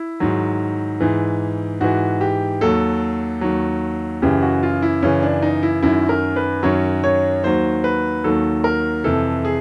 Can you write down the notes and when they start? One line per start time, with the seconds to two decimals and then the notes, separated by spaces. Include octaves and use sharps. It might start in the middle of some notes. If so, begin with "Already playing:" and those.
Already playing: E4
0.20 G#2 D#3 F#3
1.00 G#2 E3
1.81 G#2 E3 F#4
2.21 G4
2.61 D#2 D#3 F#3 A4
3.41 D#2 D#3 F#3
4.22 F#2 C#3 E3 G4
4.42 F#4
4.63 F4
4.82 E4
5.03 F#2 C#3 E3 C#4
5.23 D4
5.42 D#4
5.63 E4
5.83 F#2 D#3 F#3 E4
6.09 A#4
6.36 B4
6.63 F#2 D#3 F#3 C#5
7.04 C#5
7.44 D#2 D#3 F#3 C5
7.84 B4
8.24 D#2 D#3 F#3 A4
8.64 A#4
9.04 F2 C3 E3 A4
9.45 G#4